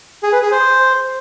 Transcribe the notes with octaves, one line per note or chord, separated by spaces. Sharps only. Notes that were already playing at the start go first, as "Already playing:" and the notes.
G#4
B4
G#4
C5